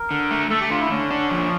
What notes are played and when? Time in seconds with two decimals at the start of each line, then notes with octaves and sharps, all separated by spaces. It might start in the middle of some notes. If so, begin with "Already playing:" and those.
Already playing: A#4
0.11 D3
0.31 A3
0.50 A3 A4
0.60 G4
0.70 D3 F4
0.80 E4
0.90 D3 C#4
1.11 D4
1.31 F3